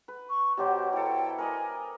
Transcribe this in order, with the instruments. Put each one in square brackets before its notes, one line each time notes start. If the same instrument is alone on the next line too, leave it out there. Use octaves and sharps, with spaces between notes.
[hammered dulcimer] B4
[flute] C#6
[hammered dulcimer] B2 F#3 C5 [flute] G4
[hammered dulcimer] E4 A4 [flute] G5
[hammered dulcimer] A#4 D5 D#5 [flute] G#5